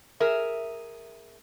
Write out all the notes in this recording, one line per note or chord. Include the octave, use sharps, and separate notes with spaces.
G#4 A#4 E5